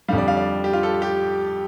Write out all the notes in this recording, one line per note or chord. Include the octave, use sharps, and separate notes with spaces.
F2 D3 G3 F5
D5
F5
D5
G4
F4
A4
G4